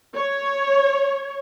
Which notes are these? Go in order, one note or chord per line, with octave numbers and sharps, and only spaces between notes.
C#5